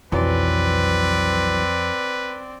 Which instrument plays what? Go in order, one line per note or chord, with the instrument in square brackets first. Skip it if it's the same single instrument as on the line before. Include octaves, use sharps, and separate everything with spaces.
[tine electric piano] B1 E3 F#3 [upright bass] F2 [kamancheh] C4 D5 [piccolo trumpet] B4